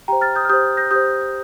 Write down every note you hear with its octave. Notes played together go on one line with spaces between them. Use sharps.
G4 C5 G5 A#5
F6 A6
D#6 G6
F6
G4 C5 D#6 G6
G6 A#6
G4 C5 D#6 G6